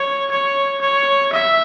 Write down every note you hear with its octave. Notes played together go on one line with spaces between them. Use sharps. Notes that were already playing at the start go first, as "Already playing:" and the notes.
Already playing: C#5
C#5
C#5
E5